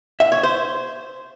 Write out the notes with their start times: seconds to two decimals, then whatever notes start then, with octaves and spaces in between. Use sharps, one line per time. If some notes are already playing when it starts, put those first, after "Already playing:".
0.20 E5
0.32 C#5
0.43 C5